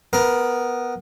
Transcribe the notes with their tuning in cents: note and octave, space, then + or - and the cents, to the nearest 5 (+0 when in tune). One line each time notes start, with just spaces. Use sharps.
B3 +0 A#4 +10